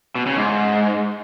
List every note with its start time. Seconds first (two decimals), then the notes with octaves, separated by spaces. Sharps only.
0.15 B2
0.26 C#3
0.37 G#2